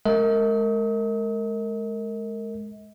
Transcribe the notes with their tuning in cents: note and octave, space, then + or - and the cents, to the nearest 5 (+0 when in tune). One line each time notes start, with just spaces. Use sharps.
G#3 +25 A#4 -25 D#5 +40